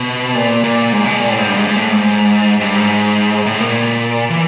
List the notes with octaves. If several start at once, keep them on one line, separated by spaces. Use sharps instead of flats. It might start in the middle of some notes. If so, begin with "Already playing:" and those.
Already playing: B2
A#2
A#2
G#2
B2
A#2
A2
G#2
G2
G#2
G#2
A2
G#2
G2
G#2
A2
A#2
E3